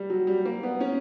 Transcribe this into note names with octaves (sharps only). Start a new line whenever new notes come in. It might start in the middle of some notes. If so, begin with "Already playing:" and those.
Already playing: G3
F#3
G3
A#3
B3
C#4